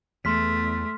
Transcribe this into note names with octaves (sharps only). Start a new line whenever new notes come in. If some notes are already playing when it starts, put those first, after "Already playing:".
E2 A3 C6 F6 B6